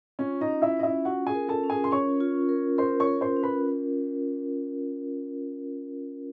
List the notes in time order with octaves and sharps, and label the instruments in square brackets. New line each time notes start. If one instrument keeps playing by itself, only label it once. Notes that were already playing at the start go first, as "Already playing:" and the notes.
[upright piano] C#4 C#5 [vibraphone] F4
[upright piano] D#4 D#5
[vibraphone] C#4
[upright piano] E4 E5
[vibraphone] C#4 [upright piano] D#5
[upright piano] E4 E5
[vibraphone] F4 [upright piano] F#4 F#5
[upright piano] G#4 G#5
[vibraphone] A#4
[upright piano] A4 A5
[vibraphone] C#4
[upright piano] G#4 G#5
C6
[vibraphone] C#4 [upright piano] C#5 C#6
[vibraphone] F4
A#4
[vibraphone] A#4 [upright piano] C5 C6
[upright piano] C#5 C#6
[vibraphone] A#4
[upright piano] C5 C6
[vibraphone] C#4
[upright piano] B4 B5